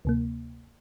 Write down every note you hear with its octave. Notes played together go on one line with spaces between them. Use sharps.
D2 C3 A#3